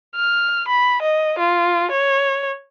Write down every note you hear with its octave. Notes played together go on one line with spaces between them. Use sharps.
F6
B5
D#5
F4
C#5